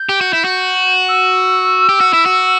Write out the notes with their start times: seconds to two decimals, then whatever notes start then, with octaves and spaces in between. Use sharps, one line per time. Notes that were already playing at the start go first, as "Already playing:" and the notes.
Already playing: G6
0.09 G4
0.21 F#4
0.33 E4
0.45 F#4
1.09 E6
1.89 G4
2.01 F#4
2.13 E4
2.26 F#4